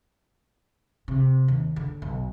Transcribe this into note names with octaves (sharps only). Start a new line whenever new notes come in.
C3
D#2
D3
B1